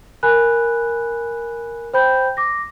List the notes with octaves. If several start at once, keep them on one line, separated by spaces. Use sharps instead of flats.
A#4 G#5 B5 F#6
C5 G5 B5 G6
D6 A#6